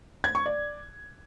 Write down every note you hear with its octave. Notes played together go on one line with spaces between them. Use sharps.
G#6
C#6
D5